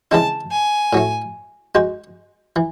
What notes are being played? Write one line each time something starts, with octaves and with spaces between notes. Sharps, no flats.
C#3 E3 G#3 C4 D#4 A5
G#5
A2 F#3 A3
G#3 D#4 F#4 C5
E3